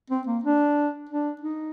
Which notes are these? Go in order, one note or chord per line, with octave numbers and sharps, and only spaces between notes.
C4
A#3
D4
D4
D#4